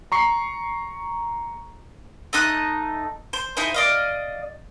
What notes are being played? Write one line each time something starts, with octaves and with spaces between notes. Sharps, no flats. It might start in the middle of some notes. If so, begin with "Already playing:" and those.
A#5 C#6 C7
A3 D#4 D#6 F#6
C5
D#4 E4 G#4 C5
D5 D#5 F5